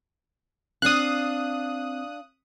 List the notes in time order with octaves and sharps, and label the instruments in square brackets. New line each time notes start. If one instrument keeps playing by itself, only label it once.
[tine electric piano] C4 [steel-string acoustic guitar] D4 F5 [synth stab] D#6 F#6